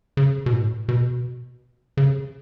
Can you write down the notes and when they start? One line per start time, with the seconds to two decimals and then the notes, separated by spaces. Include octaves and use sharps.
0.17 C#3
0.46 B2
0.53 A2
0.88 B2
1.97 C#3